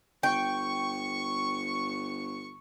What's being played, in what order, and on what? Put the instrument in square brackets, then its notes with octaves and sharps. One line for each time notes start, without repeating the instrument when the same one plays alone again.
[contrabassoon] G1 [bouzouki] G5 [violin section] C#6